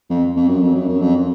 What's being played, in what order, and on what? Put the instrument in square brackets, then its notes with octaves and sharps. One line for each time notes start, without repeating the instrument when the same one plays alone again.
[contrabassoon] F2
F2
F#2
F2
F#2
F#2
F2